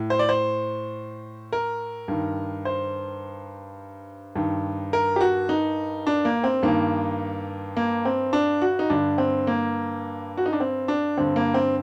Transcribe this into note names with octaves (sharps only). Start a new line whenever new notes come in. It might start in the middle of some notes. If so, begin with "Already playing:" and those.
Already playing: A2
C5
D5
C5
A#4
G2 D#3
C5
G2 D#3
A#4
G4
F#4
D#4
D4
A#3
C4
G2 D#3 A#3
A#3
C4
D4
F#4
D#4
G2 D3 D4
C4
A#3
F#4
D#4
D4
C4
D4
G2 D3 C4
A#3
C4